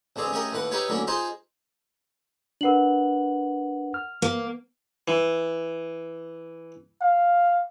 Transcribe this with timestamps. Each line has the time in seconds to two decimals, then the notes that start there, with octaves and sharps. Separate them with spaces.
0.16 A1 D3 C4 G#4 F5
0.32 A3 C#4 G4 G#4 A#4 D#5
0.52 D#2 A2 B4 F#5
0.71 D#4 E4 G4 B4 C#5
0.89 A2 D3 F#3 A3 A#3 C#4
1.07 D#4 F4 G#4 C5 A5 C6
2.61 D4 A#4 B4 F#5 F#7
3.94 F6
4.22 A#3
5.08 E3
7.01 F5